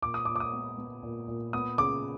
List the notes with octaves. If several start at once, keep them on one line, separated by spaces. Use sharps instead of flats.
A#2 D6
D#6
A#2 D6
D6
D#6
B3
B3
A#2
A#2
B3 D#6
C#3 D6